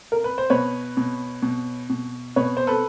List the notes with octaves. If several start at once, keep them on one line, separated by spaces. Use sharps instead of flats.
A#4
B4
C5
B2 B4 C#5
B2
B2
B2
B2 B4 C#5
C5
A4 B4